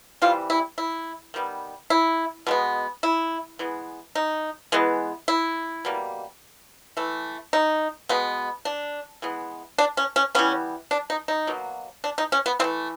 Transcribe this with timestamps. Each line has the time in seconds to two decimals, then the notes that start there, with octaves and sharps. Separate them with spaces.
0.22 C3 E3 G3 F4
0.50 E4
0.78 E4
1.34 D#3 G3 B3
1.90 E4
2.47 B2 G#3 B3
3.03 E4
3.59 E3 G#3 B3
4.15 D#4
4.72 E3 G#3 B3
5.28 E4
5.85 B2 G3 A#3
6.97 E3 A3
7.53 D#4
8.09 B2 G#3 B3
8.65 D4
9.22 E3 G#3 B3
9.78 D4
9.97 C#4
10.16 C#4
10.35 E3 G3 B3 C#4
10.91 D4
11.10 D#4
11.28 D#4
11.47 B2 F#3 A#3
12.04 D4
12.18 D#4
12.32 C#4
12.46 B3
12.59 E3 C4
12.64 A3